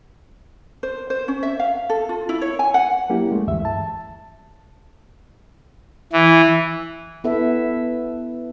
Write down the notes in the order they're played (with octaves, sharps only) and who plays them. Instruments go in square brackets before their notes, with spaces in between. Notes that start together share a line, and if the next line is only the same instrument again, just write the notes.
[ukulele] C5
C5
C#4
E5
F5
A4
F4
E4
C#5
G#5
F#5
[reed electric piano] F#3 A#3 C#4 E4 G4
G#3 A3
D2 G2 E3 E5
A5
[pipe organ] E3
[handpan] B3 E4 A4 B4 E5